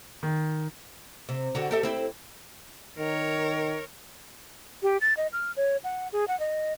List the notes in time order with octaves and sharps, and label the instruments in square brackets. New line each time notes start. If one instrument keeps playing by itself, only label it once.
[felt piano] D#3
[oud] C3
D3 F#4 G4
G4 A4 E5
C4 E4 G4
[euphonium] D#3 [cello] A#4 C#5
[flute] G4
A6
D#5
F6
C#5
F#5
G#4
F#5
D#5